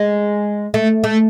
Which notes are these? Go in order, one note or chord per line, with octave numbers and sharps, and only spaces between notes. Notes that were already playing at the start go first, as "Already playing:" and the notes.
Already playing: G#3
A3
A3